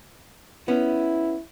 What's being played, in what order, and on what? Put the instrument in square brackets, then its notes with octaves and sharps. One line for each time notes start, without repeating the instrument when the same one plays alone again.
[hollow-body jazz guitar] B3 C#4 [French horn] E4